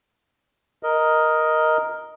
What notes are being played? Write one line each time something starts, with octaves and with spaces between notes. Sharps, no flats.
A#4 D#5